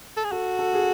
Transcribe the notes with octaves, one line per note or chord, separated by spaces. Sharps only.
A4
G#4
F#4 A4
A4
G#4